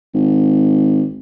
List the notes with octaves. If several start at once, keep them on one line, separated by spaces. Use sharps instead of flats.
G#1